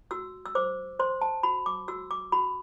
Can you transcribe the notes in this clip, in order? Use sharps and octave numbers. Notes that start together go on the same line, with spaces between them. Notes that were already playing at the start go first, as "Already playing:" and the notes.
F#4 E6
E6
C5 D6
C5 C6
A5
F#4 B5
D6
F#4 E6
D6
F#4 B5